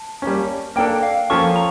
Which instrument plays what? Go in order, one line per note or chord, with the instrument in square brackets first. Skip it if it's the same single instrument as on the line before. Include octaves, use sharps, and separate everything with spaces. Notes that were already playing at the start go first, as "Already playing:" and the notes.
Already playing: [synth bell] A5
[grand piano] G3 A#3 C#4
[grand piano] A#3 D4 A4 [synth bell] G5
[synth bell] F5
[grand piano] F3 A#3 C#4 F4 A4 [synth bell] C#6
[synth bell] A#5